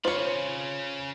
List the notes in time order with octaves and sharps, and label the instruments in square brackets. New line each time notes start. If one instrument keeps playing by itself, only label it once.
[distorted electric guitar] C#3 B5 [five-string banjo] F4 C#5 [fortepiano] C5